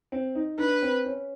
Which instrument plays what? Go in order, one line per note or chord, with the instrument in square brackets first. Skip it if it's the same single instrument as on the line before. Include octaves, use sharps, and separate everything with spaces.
[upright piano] C4
D#4
[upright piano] D4 [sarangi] B4
[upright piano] C4
C#4